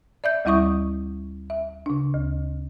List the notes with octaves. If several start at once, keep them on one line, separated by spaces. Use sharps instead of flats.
D5 E5 G6
D2 G3 E4 E5 C#6 D#6
E5
C#3 D4
D2